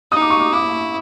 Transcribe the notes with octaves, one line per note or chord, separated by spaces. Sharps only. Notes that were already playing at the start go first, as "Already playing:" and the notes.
D#4 D#6
D6
C#6
D6
E4 D6